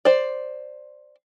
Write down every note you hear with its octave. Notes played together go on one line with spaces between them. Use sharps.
C5 D5